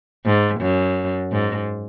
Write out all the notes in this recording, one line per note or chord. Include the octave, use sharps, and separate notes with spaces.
G#2
F#2
G#2